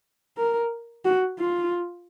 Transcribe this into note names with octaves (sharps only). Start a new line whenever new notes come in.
A#4
F#4
F4